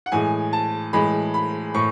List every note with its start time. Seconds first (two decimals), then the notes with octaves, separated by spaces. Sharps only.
0.06 F#5
0.12 A2 E3 G#3 G#5
0.53 A5
0.93 A2 E3 G#3 B5
1.34 B5
1.74 A2 C#6